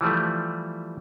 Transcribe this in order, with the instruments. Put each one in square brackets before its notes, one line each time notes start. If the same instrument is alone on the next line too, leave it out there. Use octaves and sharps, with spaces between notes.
[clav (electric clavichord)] E3 F3 G3 A3